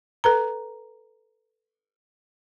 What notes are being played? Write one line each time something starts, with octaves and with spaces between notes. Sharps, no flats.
A4 B4 A#5